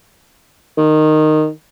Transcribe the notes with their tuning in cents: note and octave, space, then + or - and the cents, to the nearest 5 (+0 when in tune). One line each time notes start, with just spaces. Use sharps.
D#3 -10